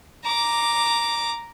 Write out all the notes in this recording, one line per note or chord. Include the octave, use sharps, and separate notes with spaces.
A#5 D6